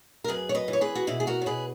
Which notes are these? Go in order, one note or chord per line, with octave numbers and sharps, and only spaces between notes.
A#4
F#2 G#4 B4
C#5
B4 D#5
E3
C#5
G#4 B4
F#4
B2 E4 G#4
G#4
F#4 A#4
C#5
B2 G#4 B4